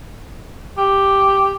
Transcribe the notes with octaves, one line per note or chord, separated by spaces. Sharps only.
G4